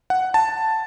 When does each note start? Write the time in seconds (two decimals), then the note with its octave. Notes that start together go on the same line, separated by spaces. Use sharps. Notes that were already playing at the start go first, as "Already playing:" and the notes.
0.10 F#5
0.34 A5